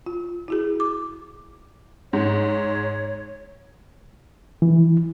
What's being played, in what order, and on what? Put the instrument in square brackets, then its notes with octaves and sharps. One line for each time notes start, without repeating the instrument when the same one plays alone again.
[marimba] F4
E4 F#4 G#4
D6
[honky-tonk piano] G#2 [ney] C#5
[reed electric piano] E3